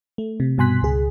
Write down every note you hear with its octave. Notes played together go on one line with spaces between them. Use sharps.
A3
C3
G2 B2 G#5 C6 F#6 B6
C#2 G#4